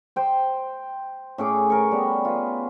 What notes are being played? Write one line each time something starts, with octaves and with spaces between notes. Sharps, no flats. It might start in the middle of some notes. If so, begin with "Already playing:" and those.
C5 G5 C6
A2 C#4 G#4 D6
A#4 C#5
G3 B3
F4 B4